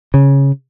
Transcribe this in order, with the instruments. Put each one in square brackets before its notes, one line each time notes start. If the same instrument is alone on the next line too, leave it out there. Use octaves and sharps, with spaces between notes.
[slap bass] C#3